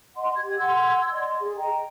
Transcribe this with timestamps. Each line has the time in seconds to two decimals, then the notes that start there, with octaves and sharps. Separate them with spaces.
0.16 D#5 F#5 C6
0.35 G4 G#6
0.58 F#5 C6 E6 G#6
1.11 D5 D#5 C6
1.40 G#4
1.57 D#5 G5 A#5